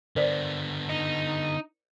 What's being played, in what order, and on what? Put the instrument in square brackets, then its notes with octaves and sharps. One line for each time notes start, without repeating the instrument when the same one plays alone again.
[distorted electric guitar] D3 B3 [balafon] A#4 C5 D5
[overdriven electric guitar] D#4